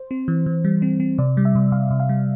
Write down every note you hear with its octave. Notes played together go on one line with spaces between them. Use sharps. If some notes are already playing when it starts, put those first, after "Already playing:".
Already playing: C5
C4
E3
E3
G3
C4
C4
C3 D5
G3
E5
C3
C3 F5
C3
F5
G3